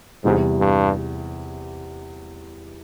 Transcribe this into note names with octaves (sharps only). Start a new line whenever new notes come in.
E2 G#2 C3 E3 G3
G2